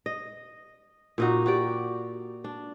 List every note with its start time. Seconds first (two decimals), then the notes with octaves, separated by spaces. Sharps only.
0.06 D#5
1.18 A#2 D#4 F#4
1.46 F#4 G4 D5
2.44 D4